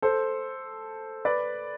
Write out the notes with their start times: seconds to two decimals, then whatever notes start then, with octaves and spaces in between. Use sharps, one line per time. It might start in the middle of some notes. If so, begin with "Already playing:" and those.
0.02 A4 C5
1.25 B4 D5